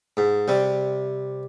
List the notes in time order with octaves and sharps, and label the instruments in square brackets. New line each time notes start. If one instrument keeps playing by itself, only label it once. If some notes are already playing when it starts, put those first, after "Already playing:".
[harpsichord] G#2
C3 G3